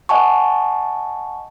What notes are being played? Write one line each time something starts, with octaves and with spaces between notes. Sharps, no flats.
D#5 F#5 G#5 A5 C#6